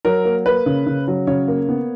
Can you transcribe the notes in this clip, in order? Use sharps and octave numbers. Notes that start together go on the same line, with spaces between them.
F#3 A#4
A#3
A#3 B4
C#3
C#3
F#3
C#3 C#5
A#3
B3